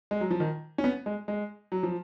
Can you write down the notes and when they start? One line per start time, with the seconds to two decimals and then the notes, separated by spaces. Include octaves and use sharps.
0.11 G#3
0.21 F#3
0.31 F3
0.40 D#3
0.78 C#4
0.84 B3
1.06 G#3
1.28 G#3
1.72 F#3
1.83 F3